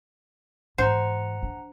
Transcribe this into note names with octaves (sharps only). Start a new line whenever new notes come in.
G#2 E3 C5 F#5 A#5
D4